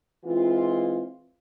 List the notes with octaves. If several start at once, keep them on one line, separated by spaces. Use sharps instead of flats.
E3 G#3 C4 F4